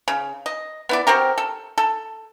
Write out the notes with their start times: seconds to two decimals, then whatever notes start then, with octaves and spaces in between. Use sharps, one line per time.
0.08 C#3
0.46 D#5
0.89 B3 E4 D5
1.07 C4 F#4 G4 A#4
1.38 A4
1.78 A4